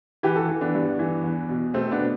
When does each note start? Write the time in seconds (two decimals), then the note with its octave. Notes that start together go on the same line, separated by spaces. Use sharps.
0.23 E3 G4 B4
0.36 F#4 A4
0.48 E3
0.61 B3 D4
0.75 G2
0.99 E3
1.24 E2
1.49 B2
1.74 B2 A3 C4
1.91 B3 D4
2.00 B2